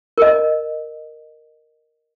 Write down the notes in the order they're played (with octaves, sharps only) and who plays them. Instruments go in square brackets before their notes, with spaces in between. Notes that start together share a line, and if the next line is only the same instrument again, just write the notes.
[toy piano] A#4 D#5